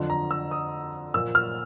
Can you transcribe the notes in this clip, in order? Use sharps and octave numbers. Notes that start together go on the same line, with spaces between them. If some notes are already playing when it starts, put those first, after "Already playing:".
Already playing: F2 D3 F3
A#5
E6
D#6
A#2 F3 A#3 E6
F6